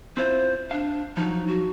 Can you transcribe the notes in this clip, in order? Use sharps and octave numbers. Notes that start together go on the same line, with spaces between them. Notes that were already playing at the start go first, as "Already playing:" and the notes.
C4 E4 F4 C5
D4 F5
F3 F#3 D#4
F#4